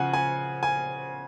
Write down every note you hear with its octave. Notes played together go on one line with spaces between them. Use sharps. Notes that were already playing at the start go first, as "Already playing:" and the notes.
Already playing: C#3 F3 F#5 G#5
G#5
G#5